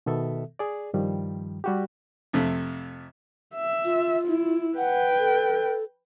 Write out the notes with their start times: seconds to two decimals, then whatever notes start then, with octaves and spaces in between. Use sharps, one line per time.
0.06 B2 D#3 B3 A4 E5
0.59 G#4 D5
0.94 G2 D#3 F3 G3
1.64 G3 F#4 G4
2.33 F2 C3 A3
3.55 E5
3.85 F4
4.27 E4
4.78 B4 F#5 G5
5.19 A4